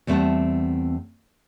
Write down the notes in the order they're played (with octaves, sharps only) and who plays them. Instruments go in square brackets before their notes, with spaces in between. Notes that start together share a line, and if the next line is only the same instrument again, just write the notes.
[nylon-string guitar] E2 G3 A3 C4 F#5 A5